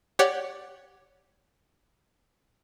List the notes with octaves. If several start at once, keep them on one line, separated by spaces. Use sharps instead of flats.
G4 C#5 D5 F#5